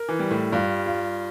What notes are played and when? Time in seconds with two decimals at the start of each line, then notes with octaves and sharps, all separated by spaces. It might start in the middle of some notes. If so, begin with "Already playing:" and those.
Already playing: A#4
0.09 E3
0.19 G3
0.31 A2
0.52 G2 F4
0.86 F4